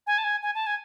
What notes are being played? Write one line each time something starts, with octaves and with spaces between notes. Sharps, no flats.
G#5
A5
G#5
G#5
A5
G#5